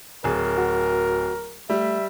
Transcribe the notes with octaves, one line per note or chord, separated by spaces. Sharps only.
D1 G#4 A#4
F#4
G3 A3 E5